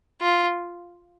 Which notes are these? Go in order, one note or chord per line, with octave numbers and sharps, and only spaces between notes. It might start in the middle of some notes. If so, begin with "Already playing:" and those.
F4